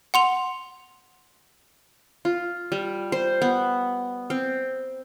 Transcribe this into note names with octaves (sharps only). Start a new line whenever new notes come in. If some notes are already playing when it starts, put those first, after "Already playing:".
F#5 C6 F7
F4
G3
C5
B3
C4